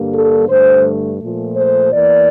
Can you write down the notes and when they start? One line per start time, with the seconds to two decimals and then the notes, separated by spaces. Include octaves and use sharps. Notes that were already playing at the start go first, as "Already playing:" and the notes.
Already playing: G2 D3 G3 A#3
0.13 A4
0.48 G2 D3 A3 C5
1.20 A#2 F3 A3
1.56 C5
1.92 E2 E3 A#3 D5